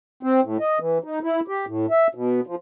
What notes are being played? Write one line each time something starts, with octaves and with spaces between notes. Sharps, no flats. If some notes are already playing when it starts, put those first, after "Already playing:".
C4
A2
D#5
E3
D#4
E4
G4
A2
E5
B2
F3